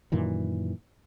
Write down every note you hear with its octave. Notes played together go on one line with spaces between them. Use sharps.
F#2 A#2 D#3 E3